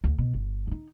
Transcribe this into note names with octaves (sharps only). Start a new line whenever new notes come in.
D2
B2
G1
D4 D#4